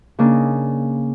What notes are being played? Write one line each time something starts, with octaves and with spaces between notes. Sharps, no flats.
C#3 A#3 D4 D#4